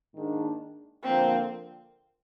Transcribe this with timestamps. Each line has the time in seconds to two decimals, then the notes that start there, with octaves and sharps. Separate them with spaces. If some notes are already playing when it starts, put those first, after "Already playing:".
0.14 G#2 D#3 A#3 D4 G#4
1.04 D3 F3 A#3 C4